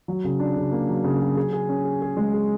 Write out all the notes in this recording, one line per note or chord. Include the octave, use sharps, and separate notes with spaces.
F#3
C#3
D4
C#3
A#3
F#3
C#3
F#3
G#4
G#4
C#4
G#4
G#4
G#3
G#4